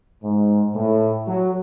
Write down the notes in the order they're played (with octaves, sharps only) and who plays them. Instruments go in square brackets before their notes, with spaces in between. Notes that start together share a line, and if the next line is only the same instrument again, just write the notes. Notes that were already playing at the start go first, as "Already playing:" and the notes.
[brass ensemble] G#2
A2
F#3